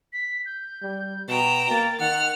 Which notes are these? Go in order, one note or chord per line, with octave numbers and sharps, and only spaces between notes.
B6
G6
G3
B2 G5 A#5 E7
A#3 A6
D#3 F#5 F6